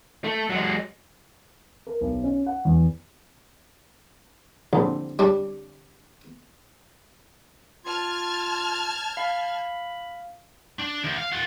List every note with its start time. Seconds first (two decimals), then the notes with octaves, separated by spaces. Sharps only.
0.24 A3
0.50 F#3 G#3
1.87 A#4
2.01 B1
2.24 C#4
2.46 F#5
2.65 E2
4.73 A#1 D3 C4
5.19 G3 D4
7.85 F4 A5 F6 G#6
9.17 F5 B5
10.80 D4
11.04 D2
11.18 F5
11.32 F4 F#5